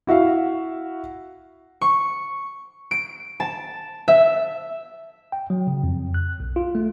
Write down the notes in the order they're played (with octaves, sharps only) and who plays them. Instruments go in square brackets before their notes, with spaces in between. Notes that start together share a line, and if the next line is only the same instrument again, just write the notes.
[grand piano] E4 F#4 E5 F5
[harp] C#6
D7
A5
E5
[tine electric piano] G5
F#3
C#3
F2
F#6
B1
F4
A3